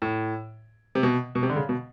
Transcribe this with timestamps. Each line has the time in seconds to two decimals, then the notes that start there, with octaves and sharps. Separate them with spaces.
0.02 A2
0.95 C3
1.03 B2
1.35 B2
1.43 C3
1.49 D3
1.56 C#3
1.69 B2